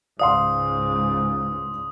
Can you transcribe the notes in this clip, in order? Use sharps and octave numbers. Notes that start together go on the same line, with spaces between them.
C#2 G#2 D5 F5 C6 D#6